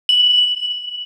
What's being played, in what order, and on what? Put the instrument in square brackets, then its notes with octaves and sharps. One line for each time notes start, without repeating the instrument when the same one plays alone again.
[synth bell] F#7